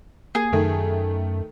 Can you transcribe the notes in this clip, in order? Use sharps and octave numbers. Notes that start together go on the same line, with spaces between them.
A#3 G#4
F#2 D#3 A3